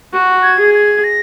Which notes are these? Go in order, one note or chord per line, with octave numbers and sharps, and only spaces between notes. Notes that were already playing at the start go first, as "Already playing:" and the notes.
F#4
G#6
G#4
G#6
A#6